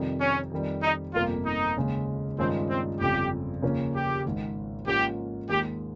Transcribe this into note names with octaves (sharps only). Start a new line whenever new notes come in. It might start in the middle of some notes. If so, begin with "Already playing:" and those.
Already playing: F2 C3 D#3 G3
C#4
F2 D#3 G3
D#4
G1 F2 C3 F3 A#3 F4
D#4
D#2 C#3 G#3
G2 D#3 G#3 C4 C#4 F4
C4
G1 F2 C#3 G4
D#2 C#3 F3 A#3 C#4
G4
G#1 G#2 D#3
G#2 F3 A#3 C#4 F4 G4
D#2 D#3 G#3 G4